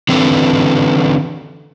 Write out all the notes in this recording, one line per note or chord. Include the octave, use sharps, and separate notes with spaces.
D3 E3 C4 A4 B4